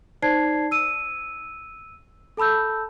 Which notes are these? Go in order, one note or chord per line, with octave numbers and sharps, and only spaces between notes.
D#4 C5 D5 A5 G#6 C7
E6 D#7
A4 A5 B5 E6 G6